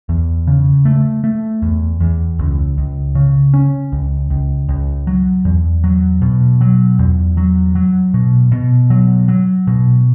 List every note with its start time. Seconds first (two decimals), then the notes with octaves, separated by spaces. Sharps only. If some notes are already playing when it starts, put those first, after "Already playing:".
0.09 E2
0.47 C#3
0.85 A3
1.24 A3
1.62 E2
2.00 E2
2.39 C#2
2.78 C#2
3.15 C#3
3.54 C#4
3.92 C#2
4.30 C#2
4.69 C#2
5.07 F#3
5.45 E2
5.84 F#3
6.22 B2
6.61 F#3
6.99 E2
7.37 F#3
7.75 F#3
8.14 B2
8.52 B2
8.90 F#3
9.28 F#3
9.67 B2